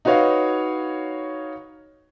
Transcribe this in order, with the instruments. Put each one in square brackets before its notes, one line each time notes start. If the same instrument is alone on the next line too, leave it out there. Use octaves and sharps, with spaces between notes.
[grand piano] D#4 F#4 B4 C#5 F5